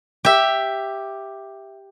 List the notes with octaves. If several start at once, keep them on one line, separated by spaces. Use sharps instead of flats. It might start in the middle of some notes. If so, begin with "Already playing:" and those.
G4 E5